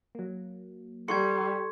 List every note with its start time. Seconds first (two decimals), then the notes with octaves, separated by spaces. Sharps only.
0.15 F#3 A#3
1.08 G3 A4 C6 C#6 G#6 C#7